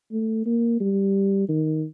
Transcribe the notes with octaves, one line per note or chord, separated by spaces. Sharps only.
A3
A#3
G3
D#3